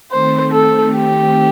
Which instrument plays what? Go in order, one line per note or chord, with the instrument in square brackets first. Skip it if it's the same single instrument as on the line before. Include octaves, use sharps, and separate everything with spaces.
[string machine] D#3 A3 C4 [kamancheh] C5
[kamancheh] A4
G4